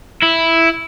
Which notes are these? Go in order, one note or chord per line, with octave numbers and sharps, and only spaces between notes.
E4